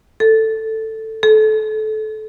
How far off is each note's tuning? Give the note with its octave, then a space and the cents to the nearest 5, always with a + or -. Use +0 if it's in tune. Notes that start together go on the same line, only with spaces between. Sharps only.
A4 +10
A4 -25